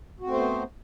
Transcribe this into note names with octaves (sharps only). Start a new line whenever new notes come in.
A3 B3 C4 F#4 C5